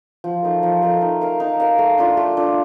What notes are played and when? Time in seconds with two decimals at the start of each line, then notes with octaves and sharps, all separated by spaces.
0.24 F3
0.43 A3 D#4 A#4
0.63 F3
0.82 A3 D#4 A#4
1.01 D#4
1.21 A#4 F5
1.40 D#4
1.60 A#4 F5
1.78 A3
1.98 D4 F4
2.17 A3
2.37 D4 F4